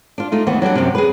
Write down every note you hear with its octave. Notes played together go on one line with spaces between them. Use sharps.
D4 F4
A3 D#4 F4
D#2 E3 B3
F#3 G3 D4 F#5
F#2 C3
G#4 B4